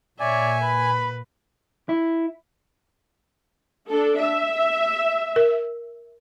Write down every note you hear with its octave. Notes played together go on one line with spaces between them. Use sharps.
A#2 C#5 D5 E5 G#5
B4 B5
E4
D4 A4
E5
A#4